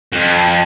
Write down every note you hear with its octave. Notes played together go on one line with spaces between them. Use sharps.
F2